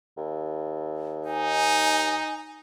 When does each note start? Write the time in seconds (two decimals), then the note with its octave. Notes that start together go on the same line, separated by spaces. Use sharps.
0.17 D#2
1.25 D#4 G#5